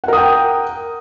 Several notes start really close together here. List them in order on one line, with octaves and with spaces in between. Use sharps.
F#5 A#4 D#6 G5